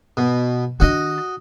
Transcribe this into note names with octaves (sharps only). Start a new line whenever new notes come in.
B2
D#3 D4 F#4 D#5